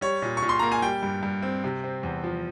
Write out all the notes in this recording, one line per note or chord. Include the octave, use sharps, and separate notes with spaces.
G3 C#5
A#2
C#6
A#2
C6
A#3 A#5
G#5
G3 G5
G2
G2
C4
C3
C4
E2
F3